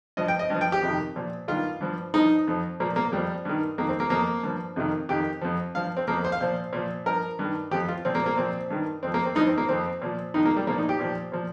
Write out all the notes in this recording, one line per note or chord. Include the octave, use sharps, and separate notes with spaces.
G2 F3 D#5
G5
D#5
G2 F3
G5
G4
F2 C3 D#3
A#2 F3
G2 D#3 F4
G2 F3
G2 F3 D#4
F2 F3
A#2 F3 A#3
A#3
F2 F3 G3
G2 D#3
F2 D#3 A#3
C4
A#3
F2 F3 A#3
G2 F3
F2 C3 D#3
F2 D#3 G4
F2 F3
G2 F3 F5
C4
F2 F3 A#3
C5
F5
A#2 F3 C5
A#2 F3
G2 F3 A#4
G2 D#3
F2 F3 G4
F4
A#2 F3 C4
A#3
A#3
A#2 F3 C4
G2 D#3
F2 F3 C4
A#3
C4
G2 F3 D#4
C4
A#3
F2 F3 C4
A#2 F3
F2 D#3 D#4
A#3
G3
A#2 F3 A#3
D#4
G4
A#2 F3
A#2 F3